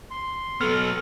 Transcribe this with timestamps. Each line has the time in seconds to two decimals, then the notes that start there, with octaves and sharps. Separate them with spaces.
0.11 C6
0.61 F#3 B3 A4 F6